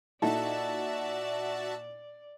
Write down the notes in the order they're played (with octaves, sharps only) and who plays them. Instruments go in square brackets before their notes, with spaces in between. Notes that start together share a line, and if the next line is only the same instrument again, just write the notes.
[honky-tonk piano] A#2 D#4 E4 [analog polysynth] F#4 E5 A5 [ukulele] A4 [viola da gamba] D5